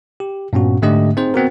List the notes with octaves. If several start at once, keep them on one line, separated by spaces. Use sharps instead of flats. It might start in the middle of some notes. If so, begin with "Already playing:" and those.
G4
G2 A#2 B3 C#4 F#4
G#2 D3 A3 D4 G4 D#5
C4 D#4 G#4 C5
B3 C4 F#4 A#4